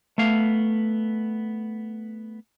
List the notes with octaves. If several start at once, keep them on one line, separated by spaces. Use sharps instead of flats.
A3 B3 F5